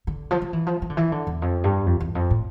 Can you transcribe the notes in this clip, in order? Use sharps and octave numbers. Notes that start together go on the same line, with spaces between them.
D3
F3
F3
E3
F3
E3
D3
E3
D3
E2
F2
G2
F2
E2
F2
A2